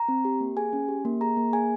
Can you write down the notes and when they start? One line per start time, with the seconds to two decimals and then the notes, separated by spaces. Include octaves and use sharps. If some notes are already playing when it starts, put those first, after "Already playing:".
Already playing: A#5
0.08 C4
0.25 G4
0.41 A#3
0.57 G#4 G#5
0.73 C#4
0.88 G4
1.05 A#3
1.21 G#4 A#5
1.37 A#3
1.53 G#4 G#5